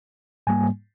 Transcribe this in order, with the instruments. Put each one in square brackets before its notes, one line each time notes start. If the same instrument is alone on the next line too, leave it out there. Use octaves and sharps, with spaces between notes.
[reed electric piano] G#2 G3 A#3 G#5